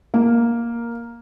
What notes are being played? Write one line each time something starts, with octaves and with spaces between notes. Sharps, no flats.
A#3